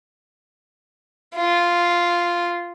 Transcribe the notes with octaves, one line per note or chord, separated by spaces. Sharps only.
F4